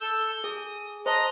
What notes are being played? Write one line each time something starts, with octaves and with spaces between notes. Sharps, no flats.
A4 E6 G6
G#4 D#6
C5 D#5 A5 A#5